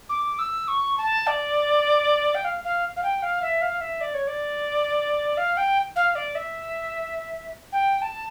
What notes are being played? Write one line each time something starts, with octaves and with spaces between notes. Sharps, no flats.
D6
E6
C#6
A5
D5
G5
F5
F5
F5
G5
F5
E5
F5
E5
D5
C#5
D5
F5
G5
F5
D5
E5
G5
A5